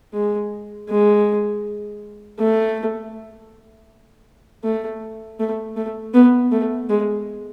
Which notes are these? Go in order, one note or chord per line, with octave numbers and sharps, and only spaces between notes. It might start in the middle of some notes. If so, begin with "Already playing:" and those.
G#3
G#3
A3
A3
A3
A3
B3
A3
G#3